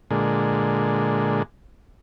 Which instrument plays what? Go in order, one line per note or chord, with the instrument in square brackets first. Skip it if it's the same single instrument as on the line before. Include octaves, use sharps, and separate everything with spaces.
[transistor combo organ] A#2 D3 G#3